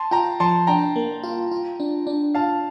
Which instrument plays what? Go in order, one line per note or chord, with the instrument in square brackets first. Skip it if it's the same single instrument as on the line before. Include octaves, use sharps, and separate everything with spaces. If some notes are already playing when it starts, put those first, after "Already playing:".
Already playing: [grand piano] A5 C6
[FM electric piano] F4 [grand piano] G5 A#5
[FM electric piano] F3 [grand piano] A5 C6
[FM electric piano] D4 [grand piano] G5 A#5
[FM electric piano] A#3
F4
F4
D4
D4
[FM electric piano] F4 [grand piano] F5 A5